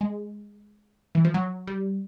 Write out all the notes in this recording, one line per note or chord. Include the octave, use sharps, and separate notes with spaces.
G#3
E3
F3
F#3
G3